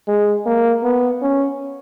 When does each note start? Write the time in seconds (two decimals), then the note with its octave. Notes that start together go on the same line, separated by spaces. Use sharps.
0.08 G#3
0.46 A#3
0.83 B3
1.22 C#4